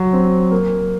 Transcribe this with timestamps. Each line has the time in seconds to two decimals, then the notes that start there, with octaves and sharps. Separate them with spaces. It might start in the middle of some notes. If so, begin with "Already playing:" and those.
Already playing: F#3
0.13 C4
0.51 A#3